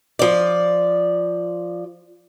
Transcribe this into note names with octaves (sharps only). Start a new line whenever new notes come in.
F3 D5